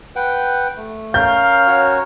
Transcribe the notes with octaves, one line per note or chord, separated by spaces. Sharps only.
B4 F#5 G5
A3
C#4 A#4 F5 G6
F#4 C#5